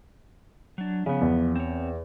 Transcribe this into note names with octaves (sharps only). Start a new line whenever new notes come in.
F#3 D4
C#3 F3 B3
E2
C4 C#5